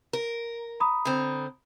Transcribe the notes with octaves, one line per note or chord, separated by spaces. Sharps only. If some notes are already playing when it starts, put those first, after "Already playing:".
A#4
A#5 B5 D#6
D3 C4